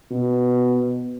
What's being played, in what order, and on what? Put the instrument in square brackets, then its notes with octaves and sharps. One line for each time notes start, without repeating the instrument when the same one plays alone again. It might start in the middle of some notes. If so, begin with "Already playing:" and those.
[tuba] B2